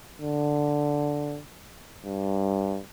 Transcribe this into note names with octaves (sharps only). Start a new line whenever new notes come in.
D3
G2